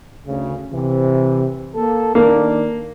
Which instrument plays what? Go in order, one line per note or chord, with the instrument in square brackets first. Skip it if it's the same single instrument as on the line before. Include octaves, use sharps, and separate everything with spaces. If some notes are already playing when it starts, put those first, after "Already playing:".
[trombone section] D2 C#3
C3 E3
A#3 A4
[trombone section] D#3 D4 [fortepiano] A#3